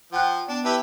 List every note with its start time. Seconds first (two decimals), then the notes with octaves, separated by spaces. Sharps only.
0.13 F3 F#5 G5 F#6
0.49 B3 D4
0.65 E4 G4 B4 A5